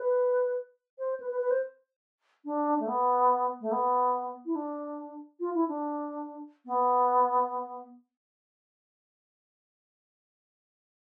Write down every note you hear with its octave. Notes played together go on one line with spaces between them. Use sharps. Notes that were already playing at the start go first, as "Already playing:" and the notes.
Already playing: B4
C5
B4
B4
B4
C5
D4
A3
B3
A3
B3
E4
D4
F4
E4
D4
B3